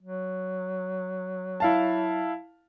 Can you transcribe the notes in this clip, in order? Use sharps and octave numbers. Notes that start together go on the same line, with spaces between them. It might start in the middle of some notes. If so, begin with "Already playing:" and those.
F#3
E4 F5 A5